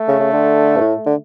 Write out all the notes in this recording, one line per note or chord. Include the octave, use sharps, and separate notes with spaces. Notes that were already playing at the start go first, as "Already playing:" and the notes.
Already playing: A3
C#3
C#3
D3
G2
A2
D3